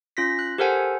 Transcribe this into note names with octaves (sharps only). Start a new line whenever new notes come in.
C#4 F4 A#6 B6
F#6
G4 A4 A#4 C5 F#5 G#5